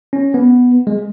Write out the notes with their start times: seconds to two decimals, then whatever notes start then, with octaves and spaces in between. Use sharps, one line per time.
0.13 C#4
0.34 B3
0.87 G#3